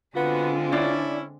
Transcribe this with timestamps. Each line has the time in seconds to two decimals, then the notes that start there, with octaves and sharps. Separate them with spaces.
0.16 D3 G#3 B3 C4 F4 F#4
0.73 C#4 D4 E4 D5